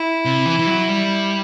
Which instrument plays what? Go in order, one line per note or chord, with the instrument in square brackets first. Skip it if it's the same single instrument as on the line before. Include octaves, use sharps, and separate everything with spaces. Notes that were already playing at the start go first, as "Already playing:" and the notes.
Already playing: [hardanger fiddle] E4
[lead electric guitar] C3
E3
E3
F#3
G3